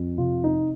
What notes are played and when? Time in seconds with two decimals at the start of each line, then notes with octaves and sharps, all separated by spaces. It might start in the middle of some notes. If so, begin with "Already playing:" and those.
Already playing: F2
0.18 C3 F4
0.44 D#4